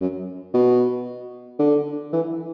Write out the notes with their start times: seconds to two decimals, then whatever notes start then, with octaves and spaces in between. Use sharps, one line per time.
0.01 F#2
0.54 B2
1.59 D3
2.13 E3